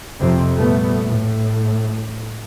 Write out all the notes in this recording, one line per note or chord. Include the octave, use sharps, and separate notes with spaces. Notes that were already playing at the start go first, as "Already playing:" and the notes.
F2 C3 C4
A#2 G3 A3 B3
A2